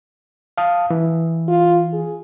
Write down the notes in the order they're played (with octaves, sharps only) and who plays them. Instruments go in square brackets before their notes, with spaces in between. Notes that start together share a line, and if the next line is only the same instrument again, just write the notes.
[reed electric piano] F5 A5 D#6
E3
[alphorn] F4
G#4